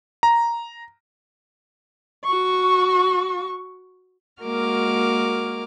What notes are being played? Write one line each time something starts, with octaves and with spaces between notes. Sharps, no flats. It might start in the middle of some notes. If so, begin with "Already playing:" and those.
A#5
F#4 C#6
G#3 A#3 F#4 A#4 D6 F6